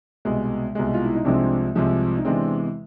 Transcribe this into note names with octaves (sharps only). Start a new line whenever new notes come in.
C2 B2 G#3
C2 B2 G#3
F4
E4
D#4
C2 C3 F3 G#3 C4 D4
C2 C3 F3 G#3
D#4
E2 C3 E3 G#3 C4 D4